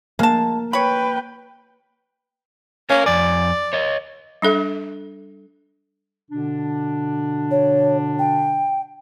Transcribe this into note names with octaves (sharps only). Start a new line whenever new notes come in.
G#3 A#3 A5
B4 C#5 G5 B5
C#4 A#4 F5
F2 D5 G#5
C#5 D#5
G3 D4 A4 E5
B2 D3 D4
C#5
G5